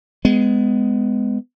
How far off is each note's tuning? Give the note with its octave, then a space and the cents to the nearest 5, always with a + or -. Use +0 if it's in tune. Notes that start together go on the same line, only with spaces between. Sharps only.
G#3 +0 B3 +25